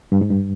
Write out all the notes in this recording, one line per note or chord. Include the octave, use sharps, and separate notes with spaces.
G2
G#2
G2